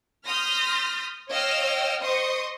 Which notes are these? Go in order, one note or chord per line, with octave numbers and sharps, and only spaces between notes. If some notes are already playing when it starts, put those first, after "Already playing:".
C6 D#6 F6 G6 A#6 B6
C#5 D#5 F5 G5 E6 F6
C5 D#5 C6 C#6 D#6